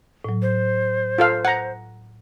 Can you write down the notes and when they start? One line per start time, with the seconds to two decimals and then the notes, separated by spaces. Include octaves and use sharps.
0.25 A2 F#3
0.42 C5
1.18 F4 A4 F5
1.45 F#5 A#5